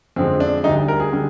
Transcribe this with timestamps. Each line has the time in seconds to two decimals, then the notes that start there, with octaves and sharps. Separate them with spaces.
0.16 F2 D3 F3 G#3 C4
0.40 D4
0.64 D2 D3 G3 D#4
0.88 A#4
1.00 G#4
1.13 D3 G3